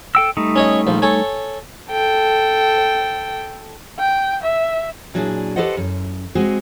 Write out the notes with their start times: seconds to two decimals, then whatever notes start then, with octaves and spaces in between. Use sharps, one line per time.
0.15 A4 G5 E6
0.37 G3 A3 D#4
0.56 C#4 C#5 D#5
0.87 A#1 F3
1.02 A4 C#5 G#5
1.91 A4 G5
3.99 G5
4.43 E5
5.14 A#2 F#3 D4 E4 G#4
5.56 G4 A4 B4 C5 D#5 F#5
5.77 F#2
6.35 G#3 C4 F#4 G#4